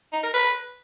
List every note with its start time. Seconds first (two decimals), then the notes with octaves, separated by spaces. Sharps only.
0.13 D#4
0.23 A#4
0.34 B4